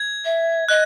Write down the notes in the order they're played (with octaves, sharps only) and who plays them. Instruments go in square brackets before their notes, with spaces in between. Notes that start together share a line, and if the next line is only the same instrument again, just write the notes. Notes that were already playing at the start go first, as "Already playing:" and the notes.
Already playing: [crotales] G#6
[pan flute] E5
[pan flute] D#5 [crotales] F#6